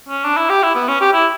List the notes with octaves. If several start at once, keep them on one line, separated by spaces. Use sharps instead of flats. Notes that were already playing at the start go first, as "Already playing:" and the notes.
C#4
D4
E4
G4
E4
B3
C#4
G4
E4